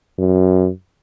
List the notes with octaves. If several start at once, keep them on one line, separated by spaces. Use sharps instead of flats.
F#2